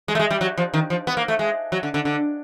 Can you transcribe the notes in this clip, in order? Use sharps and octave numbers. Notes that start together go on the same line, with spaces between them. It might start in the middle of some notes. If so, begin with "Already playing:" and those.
G#3
A3
G#3
G3
F#3
F3
D#3
F3
B3
A#3
A3
G#3
F#3
D3
D3
D3